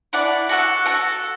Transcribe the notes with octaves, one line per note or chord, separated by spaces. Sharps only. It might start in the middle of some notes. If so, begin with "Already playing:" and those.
E4 D5 F#5 A5
F#4 A4 F#5
F#4 A4 F#5